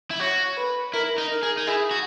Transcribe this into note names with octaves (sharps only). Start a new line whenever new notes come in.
E4
F#4 C#5
B4
E4 A#4
D#4
A#4
G#4
D#4
E4 G#4
F#4